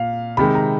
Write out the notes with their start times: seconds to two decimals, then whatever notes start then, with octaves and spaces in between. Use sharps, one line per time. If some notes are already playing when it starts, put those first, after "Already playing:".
Already playing: A#2 F5
0.37 C3 D#3 G#3 B5
0.55 A#5